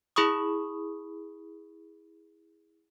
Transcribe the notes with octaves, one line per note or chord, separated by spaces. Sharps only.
E4 G#4 B5 C#6 D#6